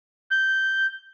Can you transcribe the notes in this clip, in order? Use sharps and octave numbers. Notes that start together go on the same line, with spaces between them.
G6